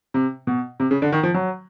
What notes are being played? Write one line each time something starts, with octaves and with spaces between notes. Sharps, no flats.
C3
B2
C3
C#3
D3
D#3
F3
F#3